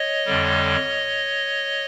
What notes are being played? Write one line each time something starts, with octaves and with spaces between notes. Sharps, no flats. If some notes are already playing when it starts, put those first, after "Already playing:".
Already playing: C#5 D#5
F2 D3 G3